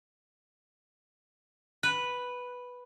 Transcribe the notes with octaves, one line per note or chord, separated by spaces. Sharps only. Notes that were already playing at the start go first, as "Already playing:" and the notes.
B4